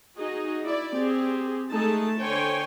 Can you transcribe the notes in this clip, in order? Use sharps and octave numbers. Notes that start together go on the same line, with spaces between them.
D#4 F#4 G#4 D#5
E4 D5
C4 G4 G#4
G#3 A3 D#4 G#4 A4 A5
D3 C5 C#5 G5 G#5